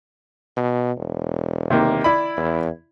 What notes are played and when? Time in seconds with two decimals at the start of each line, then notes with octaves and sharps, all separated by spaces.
0.57 B2
0.98 E1
1.70 C3 D#3 A#3
2.04 E4 D5 B5
2.37 E2